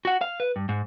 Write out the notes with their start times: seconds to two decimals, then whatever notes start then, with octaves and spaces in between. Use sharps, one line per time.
0.05 F#4 F#5
0.21 F5
0.40 B4
0.56 G2
0.69 G#2